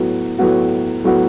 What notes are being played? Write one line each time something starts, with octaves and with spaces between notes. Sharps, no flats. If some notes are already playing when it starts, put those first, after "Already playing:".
Already playing: A2 F#3 B3 F#4
A2 F#3 B3 F#4
A2 F#3 B3 F#4